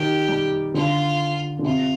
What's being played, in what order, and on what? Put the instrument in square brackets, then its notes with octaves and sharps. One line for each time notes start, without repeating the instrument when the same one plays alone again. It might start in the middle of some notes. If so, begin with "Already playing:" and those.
Already playing: [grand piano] D#3 [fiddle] G4
[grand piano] G3
[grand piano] D3 [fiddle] F4
[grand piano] D3
[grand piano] C3 [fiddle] F4